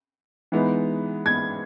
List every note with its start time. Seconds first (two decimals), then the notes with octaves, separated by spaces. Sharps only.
0.52 E3 G#3 B3 D#4
1.26 G#6